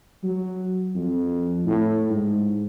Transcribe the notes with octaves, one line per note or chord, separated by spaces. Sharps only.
F#3
F2
A2
G#2